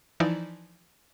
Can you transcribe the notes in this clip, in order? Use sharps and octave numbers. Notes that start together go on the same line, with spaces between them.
E3 F3 D#4 E4 D5